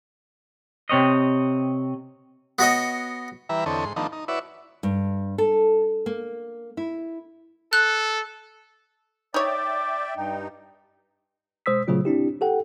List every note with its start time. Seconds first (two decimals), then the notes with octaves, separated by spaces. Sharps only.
0.89 C3 C4 C#5 D#5
2.59 B3 F#4 C#5 D#5
3.49 E3 G3 B4 E5 A#5
3.66 E2 D3 C4 A4 C#5 D#5
3.85 G#2 C6
3.96 D#3 F3 A3 B3 D4 D#4
4.12 D#4
4.28 E4 F#4 B4 C#5 D5 E5
4.83 G2
5.38 A4
6.06 A#3
6.77 E4
7.73 A4 F#6
9.34 D#4 C#5 D5 E5 G5 D6
10.17 G2 D#4 G5
11.66 B2 G#3 C5 D#6 E6 B6
11.88 A#2 C#3 F#3 A3 F4
12.05 C4 D4 E4 G4
12.41 G4 A4 F#5 G5